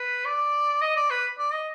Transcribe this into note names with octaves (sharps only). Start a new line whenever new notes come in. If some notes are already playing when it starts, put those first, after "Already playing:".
Already playing: B4
D5
D#5
D5
B4
D5
D#5